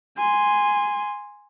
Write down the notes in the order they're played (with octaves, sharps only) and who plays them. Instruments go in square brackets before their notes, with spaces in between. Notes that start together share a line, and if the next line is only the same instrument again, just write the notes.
[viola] G#5 C6